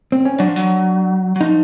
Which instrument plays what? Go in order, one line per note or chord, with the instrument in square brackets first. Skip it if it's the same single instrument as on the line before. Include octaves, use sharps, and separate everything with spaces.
[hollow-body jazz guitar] C4
C#4
[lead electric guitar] F#3 [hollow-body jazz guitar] D4
[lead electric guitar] F3
F#3
F#3
[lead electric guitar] F3 [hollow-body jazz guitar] D#4